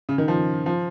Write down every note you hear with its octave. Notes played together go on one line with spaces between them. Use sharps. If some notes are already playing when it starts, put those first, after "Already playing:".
C#3
D#3
F3
F3